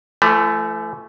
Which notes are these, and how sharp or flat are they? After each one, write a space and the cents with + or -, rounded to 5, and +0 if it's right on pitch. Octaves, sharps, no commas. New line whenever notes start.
E3 +45 A3 +0